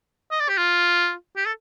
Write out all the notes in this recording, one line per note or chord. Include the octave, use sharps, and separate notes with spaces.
D#5
D5
G4
F4
G4
A4